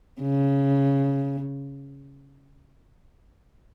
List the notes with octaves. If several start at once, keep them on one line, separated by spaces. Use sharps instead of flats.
C#3